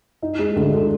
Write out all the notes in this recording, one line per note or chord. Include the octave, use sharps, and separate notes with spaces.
D#4
G#3
D2
D3